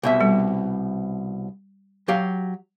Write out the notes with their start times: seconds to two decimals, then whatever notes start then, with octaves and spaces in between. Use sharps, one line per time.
0.03 C2 B2 E5
0.21 G3
2.08 F#3 G4 F5